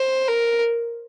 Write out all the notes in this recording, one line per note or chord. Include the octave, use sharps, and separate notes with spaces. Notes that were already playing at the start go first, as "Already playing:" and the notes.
Already playing: C5
A#4